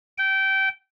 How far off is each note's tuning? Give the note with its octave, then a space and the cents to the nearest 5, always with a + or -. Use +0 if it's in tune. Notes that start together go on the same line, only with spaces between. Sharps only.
G5 -20